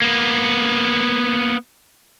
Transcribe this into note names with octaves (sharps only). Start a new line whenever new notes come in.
A#3 B3